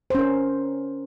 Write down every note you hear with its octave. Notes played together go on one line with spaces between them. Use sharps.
C#4 A#4 C5